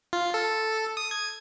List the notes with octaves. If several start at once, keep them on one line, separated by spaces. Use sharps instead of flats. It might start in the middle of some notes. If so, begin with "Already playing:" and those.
F4
A4
D#6
G#6